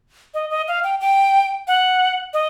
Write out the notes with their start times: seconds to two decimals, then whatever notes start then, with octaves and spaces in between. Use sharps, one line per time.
0.34 D#5
0.50 D#5
0.68 F5
0.84 G5
1.01 G5
1.68 F#5
2.33 D#5